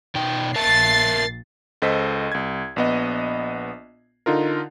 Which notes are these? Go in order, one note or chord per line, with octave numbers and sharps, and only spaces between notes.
B2 D#4 G5
A#1 A#4 E5 A5 A6 C7
C#2 A4 C5 D#5 B6
C2 G#6
A#1 B3 D#5
D3 D#4 F4 A#4